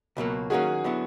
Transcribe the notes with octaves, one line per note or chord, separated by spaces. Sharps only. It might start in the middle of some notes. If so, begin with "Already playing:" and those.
C#2 B2 F#3 A#3
D#3 F#3 A#3 C#4 F#4 G#4
D3 F#3 B3 E4